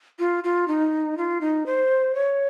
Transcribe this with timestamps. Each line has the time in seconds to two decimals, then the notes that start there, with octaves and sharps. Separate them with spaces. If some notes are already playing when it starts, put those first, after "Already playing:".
0.19 F4
0.44 F4
0.68 D#4
1.17 F4
1.41 D#4
1.66 C5
2.15 C#5